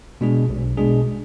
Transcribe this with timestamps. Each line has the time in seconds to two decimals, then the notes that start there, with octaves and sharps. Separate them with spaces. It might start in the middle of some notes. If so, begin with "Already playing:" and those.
0.21 B2 G#3 D4 G#4
0.49 B1
0.77 B2 G#3 D4 G#4